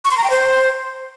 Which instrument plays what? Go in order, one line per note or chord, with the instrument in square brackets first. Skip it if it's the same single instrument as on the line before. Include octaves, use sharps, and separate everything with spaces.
[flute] C#6
C6
A#5
G5
C5